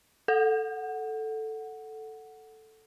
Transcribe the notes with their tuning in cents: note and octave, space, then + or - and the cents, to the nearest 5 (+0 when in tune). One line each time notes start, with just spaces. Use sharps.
A4 +0 F#5 +0